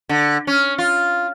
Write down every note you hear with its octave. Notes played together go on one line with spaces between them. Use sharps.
D3
C#4
F4